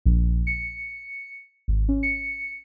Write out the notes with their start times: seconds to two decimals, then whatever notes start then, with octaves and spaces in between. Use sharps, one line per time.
0.06 A#1
0.47 C#7
1.68 G#1
1.89 C#4
2.03 C#7